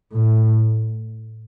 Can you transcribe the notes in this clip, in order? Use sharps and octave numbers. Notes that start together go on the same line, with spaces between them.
A2